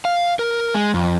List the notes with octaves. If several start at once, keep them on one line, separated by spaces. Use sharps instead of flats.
F5
A#4
G#3
F2